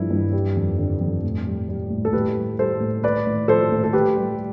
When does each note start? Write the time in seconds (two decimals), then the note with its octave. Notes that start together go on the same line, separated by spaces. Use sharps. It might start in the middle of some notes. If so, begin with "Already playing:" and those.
Already playing: G2 F3 A3 E4
0.10 G2
0.33 G3
0.57 F2
0.78 D3
1.01 F2
1.23 A2
1.46 G3
1.69 G3
1.90 A2
2.05 A4
2.13 A2 G4 B4
2.36 G3
2.59 G3 A4 C5
2.81 A2
3.04 A3 B4 D5
3.27 A2
3.48 F3 A4 C5
3.72 A2
3.84 A4
3.93 A2 G4 B4
4.17 G3